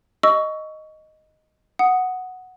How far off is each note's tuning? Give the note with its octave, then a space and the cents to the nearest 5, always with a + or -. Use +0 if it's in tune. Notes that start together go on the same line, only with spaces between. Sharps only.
D#5 +0 C#6 +20 E6 +0
F#5 +0 D#6 +0